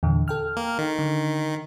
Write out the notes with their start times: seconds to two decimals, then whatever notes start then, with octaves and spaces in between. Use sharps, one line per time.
0.03 E2 A#2 D3
0.28 A4 G5 F6
0.57 A#3
0.78 D#3
0.99 D3